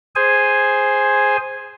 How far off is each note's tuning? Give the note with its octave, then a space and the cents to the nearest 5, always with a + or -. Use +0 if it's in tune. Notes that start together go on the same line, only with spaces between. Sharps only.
G#4 +0 C5 +5 G#5 +0